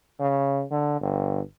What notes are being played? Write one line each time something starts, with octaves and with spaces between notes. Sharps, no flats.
C#3
D3
G1